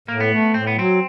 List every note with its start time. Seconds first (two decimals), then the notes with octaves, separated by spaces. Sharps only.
0.08 A2 A#3
0.20 B3
0.32 A3
0.54 A2 C4
0.67 B3
0.76 F#3 C4